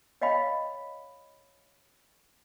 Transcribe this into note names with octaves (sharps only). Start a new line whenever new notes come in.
C#5 D#5 F5 G5 B5